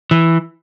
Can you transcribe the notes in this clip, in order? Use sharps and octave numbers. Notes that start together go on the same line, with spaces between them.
E3